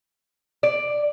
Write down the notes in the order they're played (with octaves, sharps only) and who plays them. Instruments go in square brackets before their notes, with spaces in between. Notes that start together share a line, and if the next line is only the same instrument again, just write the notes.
[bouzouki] D5